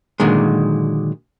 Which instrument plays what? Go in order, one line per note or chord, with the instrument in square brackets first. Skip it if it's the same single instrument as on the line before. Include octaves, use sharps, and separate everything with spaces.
[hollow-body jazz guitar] A#2 D3 D#3 F#3 G#3